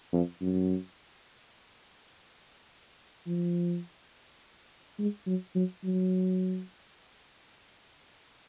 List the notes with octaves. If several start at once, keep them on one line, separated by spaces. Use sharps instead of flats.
F2
F#2
F3
G#3
F#3
F#3
F#3